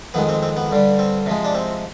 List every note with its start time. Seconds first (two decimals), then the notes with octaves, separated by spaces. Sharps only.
0.14 F2 D#3 G#3 B3
0.29 C4
0.42 C4
0.57 B3
0.71 G2 D3 G3
0.99 C4
1.26 C3 F3 G#3
1.44 D4
1.55 C4